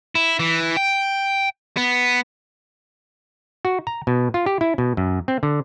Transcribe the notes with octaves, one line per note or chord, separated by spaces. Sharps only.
E4
E3
G5
B3
F#4
A#5
B2
F4
G4
E4
B2
F#2
C4
D3